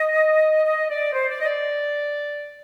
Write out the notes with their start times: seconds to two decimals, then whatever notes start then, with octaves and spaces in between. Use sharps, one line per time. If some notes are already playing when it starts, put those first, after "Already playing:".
Already playing: D#5
0.65 D#5
0.89 D5
1.13 C5
1.29 D5
1.40 D#5
1.45 D5